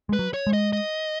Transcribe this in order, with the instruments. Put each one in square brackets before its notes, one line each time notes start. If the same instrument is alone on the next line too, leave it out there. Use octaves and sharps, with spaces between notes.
[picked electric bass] G#3 [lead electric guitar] B4
[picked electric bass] F#3
[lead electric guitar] C#5
[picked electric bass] G#3
[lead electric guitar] D#5
D#5